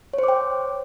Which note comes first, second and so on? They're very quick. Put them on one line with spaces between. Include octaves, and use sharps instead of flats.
C#5 C5 D6 G5